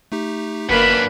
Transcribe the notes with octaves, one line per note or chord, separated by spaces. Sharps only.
A3 D#4 G4
G1 F#2 A#3 D4 B4 B5